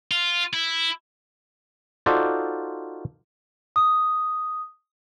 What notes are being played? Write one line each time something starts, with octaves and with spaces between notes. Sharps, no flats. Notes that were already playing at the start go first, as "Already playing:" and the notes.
F4
E4
D#4 F4 F#4 A4 C5 D5
D#6